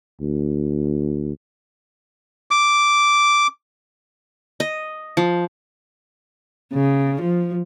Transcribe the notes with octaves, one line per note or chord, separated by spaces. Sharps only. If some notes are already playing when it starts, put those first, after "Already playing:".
D2
D6
D#5
F3
C#3
F3